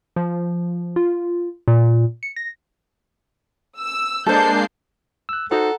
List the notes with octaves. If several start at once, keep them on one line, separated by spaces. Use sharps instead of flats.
F3
F4
A#2
C#7
A#6
E6
G#3 A#3 D4 A4 C5 A5 G6 C7
E6 F#6
D#4 F#4 A4 C5 F#5 A#5